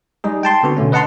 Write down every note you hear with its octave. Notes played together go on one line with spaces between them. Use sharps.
G3 G#3 D#4 G#4
G5 A5 C6
D3 B3 C4 F#4
B2 D3 A3 C#4
B4 D#5 F#5 A5 A#5 C6